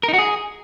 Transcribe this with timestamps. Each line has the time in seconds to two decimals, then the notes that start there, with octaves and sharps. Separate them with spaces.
0.03 A#4
0.08 D#4
0.14 F#4
0.19 G#4